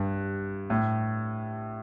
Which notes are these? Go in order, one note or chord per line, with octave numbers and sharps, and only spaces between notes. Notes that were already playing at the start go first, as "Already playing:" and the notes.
Already playing: G2
A2